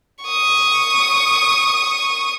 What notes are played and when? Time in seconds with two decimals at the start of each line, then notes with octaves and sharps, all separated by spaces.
0.24 C#6 D#6